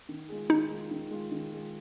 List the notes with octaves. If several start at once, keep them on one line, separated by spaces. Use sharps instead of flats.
D#3
G#3 F4 G#4
D#3 D#4
G#3 F4 G#4
D#3
G#3 F4 G#4
D#3
G#3 F4 G#4